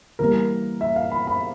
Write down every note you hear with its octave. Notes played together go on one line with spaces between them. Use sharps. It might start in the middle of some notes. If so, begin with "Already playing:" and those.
E3 G3 A#3 A#4
E5
F5
B5
B5